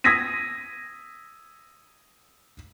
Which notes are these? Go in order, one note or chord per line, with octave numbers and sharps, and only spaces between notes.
D#6 E6 G#6 A#6 B6 D#7